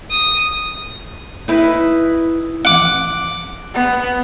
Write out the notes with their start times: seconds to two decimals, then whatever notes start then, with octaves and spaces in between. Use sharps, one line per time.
0.11 D#6
1.48 D#4 E4 B4
2.65 F#5 D6
3.74 B3